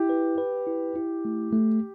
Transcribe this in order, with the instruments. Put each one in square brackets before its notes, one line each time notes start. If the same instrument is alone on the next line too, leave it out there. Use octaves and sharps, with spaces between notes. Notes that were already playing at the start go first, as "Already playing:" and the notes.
Already playing: [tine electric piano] E4 [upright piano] G4
[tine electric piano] B4
B4
E4
E4
A3
A3